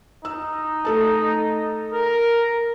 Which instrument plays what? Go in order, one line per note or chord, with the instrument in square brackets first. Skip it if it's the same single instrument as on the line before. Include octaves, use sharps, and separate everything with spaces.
[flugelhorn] D#4 [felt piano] E6
[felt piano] A3 A4 A5
[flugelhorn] A#4